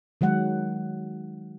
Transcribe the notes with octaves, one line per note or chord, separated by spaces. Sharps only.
D#3 F#3 G#3 F#5